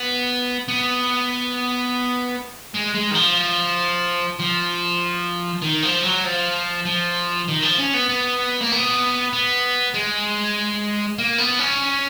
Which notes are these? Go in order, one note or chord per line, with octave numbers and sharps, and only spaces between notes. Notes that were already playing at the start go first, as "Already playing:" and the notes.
Already playing: B3
B3
G#3
G#3
D#3
F3
F3
D#3
F3
F#3
F3
F3
D#3
F3
C#4
B3
B3
A#3
B3
B3
G#3
A#3
B3
C#4